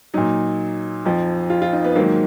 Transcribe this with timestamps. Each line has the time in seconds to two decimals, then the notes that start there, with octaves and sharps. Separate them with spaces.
0.14 A#2 F#3 D#4
1.05 F2 F3
1.50 F4
1.62 F4
1.73 D#4
1.84 B3
1.95 G#2 D#3 F#3 A#3